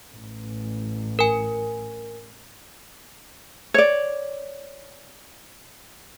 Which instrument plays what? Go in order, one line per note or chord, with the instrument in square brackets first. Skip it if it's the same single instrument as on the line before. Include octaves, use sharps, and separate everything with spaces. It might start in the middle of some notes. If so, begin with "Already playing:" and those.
[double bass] A1
[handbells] A#4 G#5
[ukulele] C#5 D5